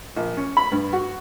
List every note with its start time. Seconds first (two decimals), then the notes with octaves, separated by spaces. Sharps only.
0.16 A#1
0.37 C#4
0.57 B5
0.72 G2
0.93 F#4